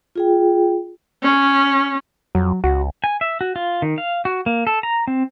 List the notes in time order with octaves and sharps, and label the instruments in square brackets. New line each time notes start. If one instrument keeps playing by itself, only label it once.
[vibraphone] F4 G#4 G5
[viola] C#4
[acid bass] F2 [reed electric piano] F#3
[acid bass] C#2 [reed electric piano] F#4
[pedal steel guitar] G#5
E5
F#4
F4
D#3
F5
F#4
A#3
A4
A#5
C4